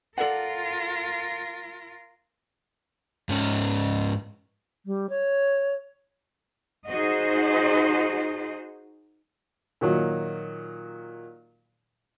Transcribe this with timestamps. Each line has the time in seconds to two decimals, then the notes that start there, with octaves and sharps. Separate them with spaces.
0.18 F4 A4 A#4 D5 F#5
3.29 G#2 C#4
4.86 G3
5.10 C#5
6.89 D#4 F#4 G#4 C5 D#5
9.81 A#2 D#3 F#3